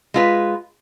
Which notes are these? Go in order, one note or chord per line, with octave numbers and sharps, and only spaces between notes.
G#3 F4 B4